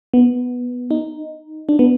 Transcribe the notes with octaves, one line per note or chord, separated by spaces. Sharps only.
B3
D#4
D4
B3